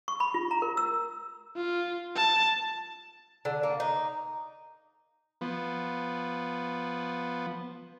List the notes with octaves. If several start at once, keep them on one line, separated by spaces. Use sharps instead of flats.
C#6
B5
F4
A#5
A#4
E6
F4
A5
D3
A#3
D#4
F3 B3